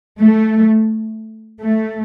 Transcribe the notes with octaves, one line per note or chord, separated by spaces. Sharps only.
A3
A3